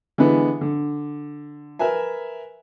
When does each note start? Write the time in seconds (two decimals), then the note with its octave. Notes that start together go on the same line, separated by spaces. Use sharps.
0.18 D3 E3 G#3 B3
0.61 D3
1.79 A#4 B4 E5 G#5